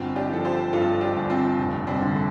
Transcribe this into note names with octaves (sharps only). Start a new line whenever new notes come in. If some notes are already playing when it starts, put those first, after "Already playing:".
Already playing: G1 C4 F4
D4 G4
F3 A4
G4 C5
G2 F4 A4
D4 G4
G1
C4 F4
F1
G3 C4
D3
A3